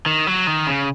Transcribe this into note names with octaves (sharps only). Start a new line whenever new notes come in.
D#3
F#3
D#3
C#3